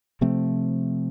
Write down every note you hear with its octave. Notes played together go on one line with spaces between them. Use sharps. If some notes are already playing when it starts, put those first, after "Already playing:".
C3 F3 A3 C4